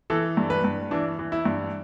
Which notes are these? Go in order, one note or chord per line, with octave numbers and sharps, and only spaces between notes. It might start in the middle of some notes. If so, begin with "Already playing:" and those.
E3 A4
G2
B4
G2
E3 D4
E3
E4
G2